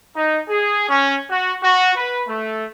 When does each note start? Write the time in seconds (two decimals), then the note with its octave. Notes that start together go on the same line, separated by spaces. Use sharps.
0.17 D#4
0.50 G#4
0.90 C#4
1.30 F#4
1.63 F#4
1.97 B4
2.28 A3